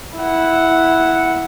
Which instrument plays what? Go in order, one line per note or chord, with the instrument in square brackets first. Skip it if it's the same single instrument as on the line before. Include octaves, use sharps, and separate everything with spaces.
[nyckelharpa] E4 F#5